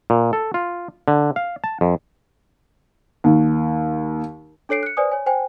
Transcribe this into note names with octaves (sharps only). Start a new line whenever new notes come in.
A#2
A4
F4
D3
F5
A5
F2
D#2
D4 A4 C#5 C7 D7
F#6 C#7
B4 C5 D5 G#5 D#6
C#5 G#5
C5 G5 G#5